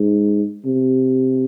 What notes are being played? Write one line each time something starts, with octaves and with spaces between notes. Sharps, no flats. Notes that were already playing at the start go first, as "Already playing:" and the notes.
Already playing: G#2
C3